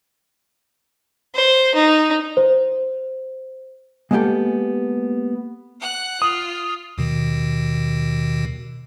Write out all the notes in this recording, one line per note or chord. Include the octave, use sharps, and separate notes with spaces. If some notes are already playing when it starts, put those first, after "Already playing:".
C5
D#4
C5
G#3 A#3 B3 C#4 G4 A4
F#5 F#6
F4 D#6
D#2 B2 D#3